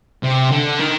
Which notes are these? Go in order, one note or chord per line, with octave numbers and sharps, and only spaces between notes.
C3
D3
D#3